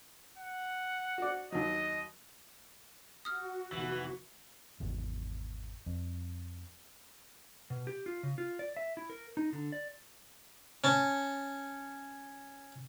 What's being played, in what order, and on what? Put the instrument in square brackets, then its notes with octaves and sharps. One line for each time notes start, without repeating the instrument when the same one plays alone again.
[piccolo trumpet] F#5
[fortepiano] F#4 D5
[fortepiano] D#2 F#3 [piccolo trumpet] D#5
[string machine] F#4 [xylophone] D#6 F6
[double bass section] F1 D#3 B3 [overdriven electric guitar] E3
[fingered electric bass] G#1 E2
F2
[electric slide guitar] B2
G4
F4
C#3
F4
D5
E5
E4
A#4
D#4
D3
D5
[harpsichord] C#4 A5